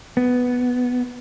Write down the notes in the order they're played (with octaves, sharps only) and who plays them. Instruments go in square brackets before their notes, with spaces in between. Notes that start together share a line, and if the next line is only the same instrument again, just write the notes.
[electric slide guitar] B3